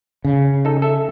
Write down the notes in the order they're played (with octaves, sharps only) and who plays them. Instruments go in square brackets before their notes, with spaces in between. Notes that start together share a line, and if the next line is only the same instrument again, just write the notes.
[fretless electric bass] C#3
[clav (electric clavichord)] D#4 A4
A4 E5